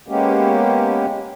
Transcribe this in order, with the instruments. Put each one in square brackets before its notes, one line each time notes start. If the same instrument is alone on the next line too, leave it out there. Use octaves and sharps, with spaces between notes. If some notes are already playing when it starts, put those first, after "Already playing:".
[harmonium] G#3 A#3 B3 C#4 G4